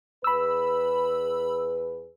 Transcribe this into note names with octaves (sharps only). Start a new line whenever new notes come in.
E2 G#4 B4 B5 E6